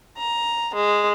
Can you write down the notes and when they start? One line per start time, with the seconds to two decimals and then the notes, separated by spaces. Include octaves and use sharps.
0.18 A#5
0.74 G#3